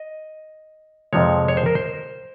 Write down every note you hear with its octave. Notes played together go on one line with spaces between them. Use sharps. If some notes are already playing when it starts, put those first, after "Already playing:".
Already playing: D#5
F2 C3 F3 G#3 C#5
C#5
C5
A#4
C5